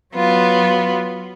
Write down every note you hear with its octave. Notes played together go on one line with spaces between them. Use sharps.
F#3 B3 F4